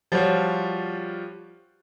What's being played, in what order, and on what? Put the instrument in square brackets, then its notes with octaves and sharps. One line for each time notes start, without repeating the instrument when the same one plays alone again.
[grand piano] F3 G3 F4 F#4 C#5